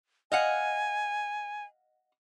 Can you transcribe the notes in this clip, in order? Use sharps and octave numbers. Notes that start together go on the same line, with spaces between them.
D#5 F5 F#5 G#5